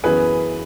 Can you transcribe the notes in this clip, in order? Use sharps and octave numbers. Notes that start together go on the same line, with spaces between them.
F#2 E3 B3 G#4 B4